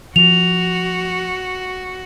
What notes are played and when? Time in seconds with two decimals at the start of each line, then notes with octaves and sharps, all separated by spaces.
0.16 F3 F#4 F7